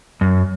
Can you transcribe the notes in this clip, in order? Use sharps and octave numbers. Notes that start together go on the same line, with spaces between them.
F#2